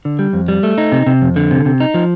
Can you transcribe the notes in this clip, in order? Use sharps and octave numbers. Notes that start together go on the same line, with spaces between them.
D3
G3
F2
G3
A3
D#4
C3
C3
F2
D3
C3
C3
D#4
F3